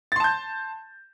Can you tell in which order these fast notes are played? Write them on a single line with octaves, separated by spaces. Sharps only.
A6 C6 A5 G6